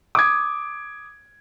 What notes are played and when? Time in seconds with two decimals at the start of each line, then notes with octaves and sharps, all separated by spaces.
0.15 D6 D#6 G#6